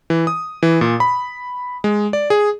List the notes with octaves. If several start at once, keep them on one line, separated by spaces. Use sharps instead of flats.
E3
D#6
E3
A#2
B5
G#3
D5
G#4